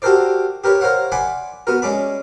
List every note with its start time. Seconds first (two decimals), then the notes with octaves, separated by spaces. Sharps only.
0.02 F#4 G4 A4 A#4 C5 D5
0.64 G4 A#4 B4 C#5
0.81 A#4 C5 C#5 F5 F#5
1.12 D5 F#5 G#5 B5 C6
1.67 B3 F#4 A#4
1.82 G#3 C#4 D5 B5